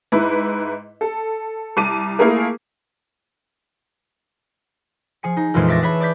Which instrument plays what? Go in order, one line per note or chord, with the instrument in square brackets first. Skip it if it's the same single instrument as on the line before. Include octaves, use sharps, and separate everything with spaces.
[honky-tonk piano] G#2 E4 B4
A4
C2 A5 D6 D#7
A3 A#3 E4 F4 G#4 A#4
[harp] F3 G#4 G#5 C#7
D#4
A#1 F2 A#2 E3 G#3
E5 D6 A6 A#6
G#4 B4 C#5 E5 A5 B5
D5 D6 G6 B6